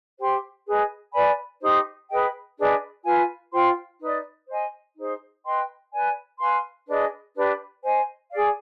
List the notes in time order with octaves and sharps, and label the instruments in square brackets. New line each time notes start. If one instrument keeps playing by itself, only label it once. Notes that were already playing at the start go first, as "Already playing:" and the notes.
[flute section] G4 C5 G5 C6
G#4 B4 D#5
B4 D5 G#5 B5
D#4 G4 C5
G#4 B4 D#5 G5
D4 G#4 B4 D#5
F4 B4 F5 G#5
F4 C5 G5 C6
D#4 B4 D5
C5 D#5 G#5
D#4 G#4 C5
B4 D#5 G5 C6
B4 D5 G#5
B4 F5 G#5 C6
D4 G#4 B4 D#5
D4 G4 B4
C5 D#5 G#5
G#4 D5 F5